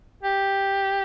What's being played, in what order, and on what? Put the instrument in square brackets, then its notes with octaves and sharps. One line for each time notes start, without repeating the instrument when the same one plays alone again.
[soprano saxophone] G4